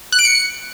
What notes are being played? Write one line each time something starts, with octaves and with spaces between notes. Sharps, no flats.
F#6
D7
C#7